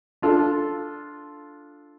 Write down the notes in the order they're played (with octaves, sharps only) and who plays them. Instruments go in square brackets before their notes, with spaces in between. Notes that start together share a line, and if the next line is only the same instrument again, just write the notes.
[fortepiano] D4 F4 A4